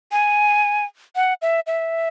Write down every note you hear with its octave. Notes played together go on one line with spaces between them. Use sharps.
G#5
F#5
E5
E5